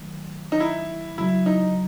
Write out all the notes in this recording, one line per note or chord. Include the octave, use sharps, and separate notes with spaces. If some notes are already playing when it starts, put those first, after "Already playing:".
Already playing: D#3 F#3 A3
D#4
E4
F#2 C#3 F#3 E4
D#4